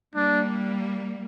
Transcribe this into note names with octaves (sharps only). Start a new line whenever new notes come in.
G3 A#3 D4